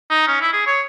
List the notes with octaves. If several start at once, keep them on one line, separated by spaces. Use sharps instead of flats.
D#4
C#4
E4
G#4
C#5